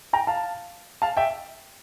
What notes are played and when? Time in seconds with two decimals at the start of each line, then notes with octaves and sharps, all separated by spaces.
0.13 G5 A#5
0.27 F5 A5
1.02 F5 A5
1.17 E5 G5